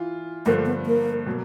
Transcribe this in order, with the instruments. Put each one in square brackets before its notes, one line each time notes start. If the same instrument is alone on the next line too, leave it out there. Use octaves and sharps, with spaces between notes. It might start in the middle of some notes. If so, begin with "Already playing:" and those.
Already playing: [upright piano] E3 F4
[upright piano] G2 D3 F3 A3 [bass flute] A#3
[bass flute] B3
A#3
[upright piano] B2 F#3 A#3